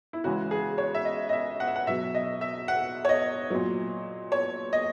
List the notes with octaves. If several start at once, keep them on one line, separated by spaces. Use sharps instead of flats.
E4
C#3 E3 G#3 F#4
G#4
C#5
E5
D#5
D#5
E5
F#5
E5
F#5
B2 F#3 E5
D#5
E5
F#5
C#5
D#5
A#2 F#3
C#5
D#5